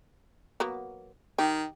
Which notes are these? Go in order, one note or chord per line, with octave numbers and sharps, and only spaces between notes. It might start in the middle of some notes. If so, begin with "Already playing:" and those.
F#3 A#3 B3
D#3 G4